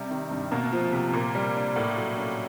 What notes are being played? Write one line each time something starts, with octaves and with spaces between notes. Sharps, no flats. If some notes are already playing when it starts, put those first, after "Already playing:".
Already playing: C3 G3
D#3
G2
B2 A#3
F3
C3
A#2 A#3
G3
D4
A2 A#3
F#3
C#4